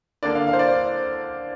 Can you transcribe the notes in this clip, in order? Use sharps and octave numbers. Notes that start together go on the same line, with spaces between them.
D3 A#3 D4 D5
F5
F5
C5
D5
C5